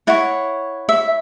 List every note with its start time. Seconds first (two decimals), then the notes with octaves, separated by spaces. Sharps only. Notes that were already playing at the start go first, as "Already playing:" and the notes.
0.07 E4 C#5 F#5
0.89 E5